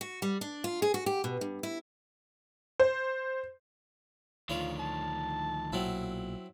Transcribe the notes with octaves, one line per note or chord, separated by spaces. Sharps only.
F#4
G3
D4
F4
G#4
F#4
G4
B2
G2
E4
C5
D2 D#3 F3 F4 C#5 D5
A5
B1 A#2 F#3 C4 E4